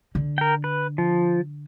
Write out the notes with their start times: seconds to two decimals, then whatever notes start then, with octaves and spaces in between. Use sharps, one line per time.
0.15 D3
0.38 A#4 G5
0.64 B4
0.98 F3